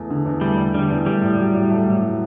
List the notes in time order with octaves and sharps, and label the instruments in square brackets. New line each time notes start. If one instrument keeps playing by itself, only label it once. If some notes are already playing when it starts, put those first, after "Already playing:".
Already playing: [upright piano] E2 A3
D3
E2
[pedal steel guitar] G3 [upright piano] A3
[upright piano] E2
[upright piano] D3 [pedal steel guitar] G3
[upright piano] E2
[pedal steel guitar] G3 [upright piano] A3
[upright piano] A2
F#3
A2
A3
A2
F#3